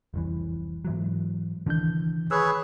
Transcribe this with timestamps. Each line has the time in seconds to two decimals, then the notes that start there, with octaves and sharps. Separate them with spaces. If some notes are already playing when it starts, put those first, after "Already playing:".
0.14 F1 C2 E3
0.85 G#2 E3 F#3
1.66 C#2 D#3 E3 D4 G6
2.31 G#4 B4 C#5 B5 E6